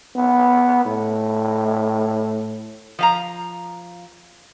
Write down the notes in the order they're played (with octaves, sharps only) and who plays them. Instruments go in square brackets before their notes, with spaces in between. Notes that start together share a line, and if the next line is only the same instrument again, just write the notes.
[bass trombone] B3
A2
[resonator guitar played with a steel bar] F3 F5 A#5